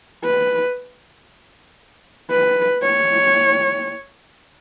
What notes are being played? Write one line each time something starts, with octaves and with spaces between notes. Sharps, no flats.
B4
B4
C#5